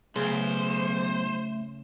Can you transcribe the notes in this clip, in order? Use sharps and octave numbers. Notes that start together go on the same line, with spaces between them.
B1 C#3 A3 C5